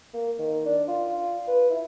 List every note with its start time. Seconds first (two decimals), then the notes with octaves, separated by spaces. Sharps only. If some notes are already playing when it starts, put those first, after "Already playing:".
0.13 A#3
0.39 D#3
0.65 D4
0.88 F4
1.48 B4
1.70 E4